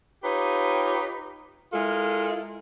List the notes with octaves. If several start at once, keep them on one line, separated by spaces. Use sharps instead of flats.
D#4 F4 G4 B4 C#5
G#3 E4 F4 A4 A#4